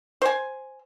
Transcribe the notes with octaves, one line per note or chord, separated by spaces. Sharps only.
C5 G#5